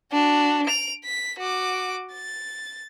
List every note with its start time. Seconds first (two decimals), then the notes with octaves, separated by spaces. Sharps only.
0.12 D4 F#4
0.66 D7 F7
1.04 B6
1.39 F#4 D6
2.13 A6